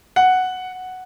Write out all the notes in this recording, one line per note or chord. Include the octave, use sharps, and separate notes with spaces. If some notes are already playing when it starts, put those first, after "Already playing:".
F#5